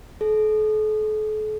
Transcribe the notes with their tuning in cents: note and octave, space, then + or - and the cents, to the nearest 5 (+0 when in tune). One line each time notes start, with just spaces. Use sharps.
A4 -40